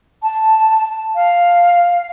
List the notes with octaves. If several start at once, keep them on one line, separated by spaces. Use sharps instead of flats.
A5
F5